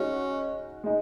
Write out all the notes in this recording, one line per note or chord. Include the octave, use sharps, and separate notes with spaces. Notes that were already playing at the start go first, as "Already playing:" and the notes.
Already playing: G#3 C#4 D#4 F#4
G#3 D#4